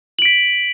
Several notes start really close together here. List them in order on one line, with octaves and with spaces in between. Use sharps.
F#7 D7 B6